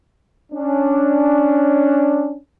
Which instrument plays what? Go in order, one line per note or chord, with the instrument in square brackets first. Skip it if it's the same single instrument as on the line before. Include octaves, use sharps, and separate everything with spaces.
[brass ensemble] C#4 D4